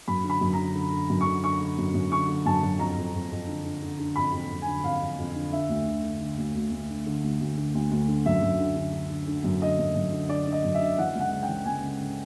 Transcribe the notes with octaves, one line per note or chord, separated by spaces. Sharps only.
F#2 B5
D3
B5
F#2
D3 A#5
D3
D3
F#2
C#6
D3
D3 C#6
D3
F#2
F#2
D3 C#6
D3
F#2 A5
F#2
F2 A#5
F2
F2
F2
D3
D3
D3
D3
F2 B5
F2
F2
G#5
D3
F2 F5
F2
F2
D3
D3 E5
D2
D3
D3
D3
D2
D2
D2
D3
D3
D2
D2
D3
D2
D2
D3
F#2 E5
F#2
D3
D3
D3
D3
D3
F#2
D3 D#5
F#2
F#2
D3
D3 D5
D3
D#5
F#2
E5
D3
E3 F#5
C#2 F#5
C#3
G5
E3
C#2 G#5
C#3
C#3